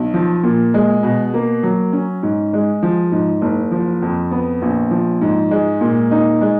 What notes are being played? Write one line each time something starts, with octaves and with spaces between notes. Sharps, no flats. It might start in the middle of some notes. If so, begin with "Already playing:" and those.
Already playing: B1
F3
A#2
G#3
B2
A#3
F#3
C#4
G#2
G#3
F3
G#2
F#1
F3
F2
B3
A#1
F3
G#2
G#3
A#2
D#4
G#3